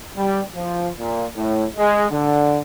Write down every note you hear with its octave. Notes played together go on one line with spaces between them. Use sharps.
G3
F3
A#2
A2
G#3
D3